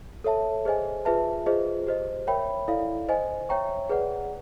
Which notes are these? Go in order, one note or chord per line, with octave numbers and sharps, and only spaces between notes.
A4 C#5 E5 A5
G#4 C5 D#5 G#5
F4 G#4 B4 E5 A5
F4 G#4 C5 D#5
G4 C5 D#5
A#4 C#5 E5 G5 B5
E4 A4 D5 F5
C5 D#5 G#5
C#5 E5 G5 A#5 C#6
G#4 B4 D5 F#5